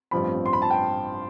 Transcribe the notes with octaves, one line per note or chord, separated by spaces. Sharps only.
A1 G2 F3 C4 B5
C6
B5
A5
G5